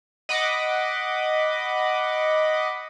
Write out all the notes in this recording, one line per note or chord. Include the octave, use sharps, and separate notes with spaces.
D#5 F#5 B5 D6